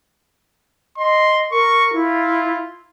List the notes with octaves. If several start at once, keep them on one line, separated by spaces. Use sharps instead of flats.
D#5 C6
A#4 C#6
E4 F4